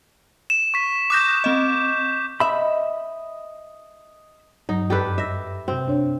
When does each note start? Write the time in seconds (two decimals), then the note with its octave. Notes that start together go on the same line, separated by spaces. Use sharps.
0.50 E7
0.74 C#6 B6
1.10 D6 D#6 F#6 G6 A#6
1.44 C4 D#5
2.40 D#5 E5 B5
4.69 G2 F#3 D#4
4.90 F#2 G4 A4 B4 D5
5.18 D#5 E5 A#6
5.68 C3 C4 F#4
5.88 D4 C#5